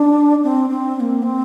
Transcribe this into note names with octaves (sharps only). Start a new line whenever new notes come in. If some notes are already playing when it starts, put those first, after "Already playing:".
Already playing: D4
C4
C4
C4
A#3
C4